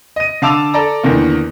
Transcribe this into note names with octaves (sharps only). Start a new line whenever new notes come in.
D#5 D#7
D3 F5 A5 D6 E6 F7
A4 D5 A#5
E2 D3 D#3 A#3